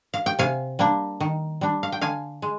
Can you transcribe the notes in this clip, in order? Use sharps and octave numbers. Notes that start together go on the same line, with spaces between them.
F5
G5
C3 F5 G#5
G3 A#3 D4
D#3
G3 D4
F5
G5
D3 F5 G#5
G#3